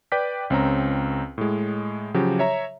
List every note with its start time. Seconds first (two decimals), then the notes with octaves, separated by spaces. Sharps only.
0.12 B4 D5 G5 D6 G6 B6
0.50 C#2 C4 C#4 A#5
1.38 A2 G#3
2.14 C#3 F3 F#3 G4
2.39 C#5 E5 A#5